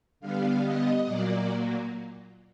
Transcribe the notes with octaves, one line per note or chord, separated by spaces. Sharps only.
D3 G3 B3 F5
D#5
A#2 F#3 A#3 D5